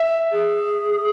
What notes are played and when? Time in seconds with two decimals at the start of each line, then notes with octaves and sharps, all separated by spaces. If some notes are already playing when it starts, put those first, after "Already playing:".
Already playing: E5
0.32 G#4